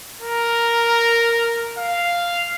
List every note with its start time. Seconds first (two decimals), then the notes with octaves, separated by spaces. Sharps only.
0.22 A#4
1.78 F5